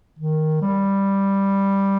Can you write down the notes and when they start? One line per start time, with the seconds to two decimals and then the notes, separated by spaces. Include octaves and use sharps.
0.19 D#3
0.62 G3